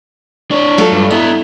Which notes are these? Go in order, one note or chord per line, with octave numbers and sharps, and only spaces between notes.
D4 C#5
F#3 A3 F4
G2
B3 E4 D#5